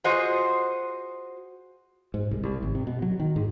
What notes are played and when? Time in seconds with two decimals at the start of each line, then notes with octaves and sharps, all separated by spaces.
0.04 F4 F#4 G#4 C5 D#5
2.14 G#2
2.31 C2
2.43 C2
2.62 G#1
2.75 C3
2.87 B2
3.02 F#3
3.20 D#3
3.36 G#2